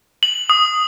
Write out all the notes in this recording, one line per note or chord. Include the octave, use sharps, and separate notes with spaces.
F#7
D#6